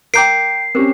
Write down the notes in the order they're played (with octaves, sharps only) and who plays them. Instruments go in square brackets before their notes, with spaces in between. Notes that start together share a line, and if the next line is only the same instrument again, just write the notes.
[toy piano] A#4 A#5 D6 [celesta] G5 G6 D7 [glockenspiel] C7
[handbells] C4 C#4 [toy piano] G4 A#4